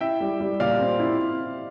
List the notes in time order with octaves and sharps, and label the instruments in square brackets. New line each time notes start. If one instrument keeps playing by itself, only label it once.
[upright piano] E4 [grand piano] E5 G5
[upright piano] G3
G3
[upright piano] A#2 [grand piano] D5 F5
[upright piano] C4
E4